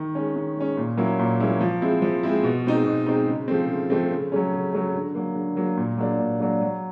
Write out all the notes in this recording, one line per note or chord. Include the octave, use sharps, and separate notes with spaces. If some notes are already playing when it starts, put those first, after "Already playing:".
Already playing: D#3
G#3 C#4
D#3
G#3 C#4
A#2
F#3 A#3 C#4 E4
A#2
F#3 A#3 C#4 E4
F3
G#3 C4 E4
F3
G#3 C4 E4
B2
G#3 C4 D#4
B2
G#3 C4 D#4
C#3
F3 A3 C4
C#3
F3 A3 C4
C#3
F#3 A3 C#4
C#3
F#3 A3 C#4
D3
F#3 A#3
D3
F#3 A#3
A#2
F#3 A#3 D4
A#2
F#3 A#3 D4
F#3